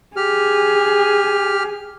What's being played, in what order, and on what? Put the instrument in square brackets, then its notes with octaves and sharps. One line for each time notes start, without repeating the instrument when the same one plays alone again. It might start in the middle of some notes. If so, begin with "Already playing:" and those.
[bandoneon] G4 F6 [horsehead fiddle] G#4